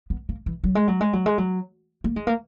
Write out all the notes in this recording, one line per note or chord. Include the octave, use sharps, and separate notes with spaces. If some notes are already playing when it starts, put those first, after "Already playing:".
B3
A#3
E3
F#3
G#3
F#3
G#3
F#3
G#3
F#3
A#3
G#3
A#3